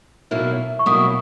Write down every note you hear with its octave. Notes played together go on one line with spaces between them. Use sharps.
B2 F#3 A#3 E4
C#6
B2 F#3 A#3 E4 D#6